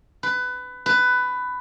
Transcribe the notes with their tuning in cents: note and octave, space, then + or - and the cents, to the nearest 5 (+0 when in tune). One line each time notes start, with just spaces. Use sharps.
B4 +20
B4 +15